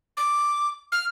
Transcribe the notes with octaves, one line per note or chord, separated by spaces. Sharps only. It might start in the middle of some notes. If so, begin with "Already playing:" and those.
D6
F6